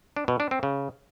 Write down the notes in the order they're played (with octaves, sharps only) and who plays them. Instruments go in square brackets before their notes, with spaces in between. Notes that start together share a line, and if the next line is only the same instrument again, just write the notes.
[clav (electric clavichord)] D4
B2
D4
C4
C#3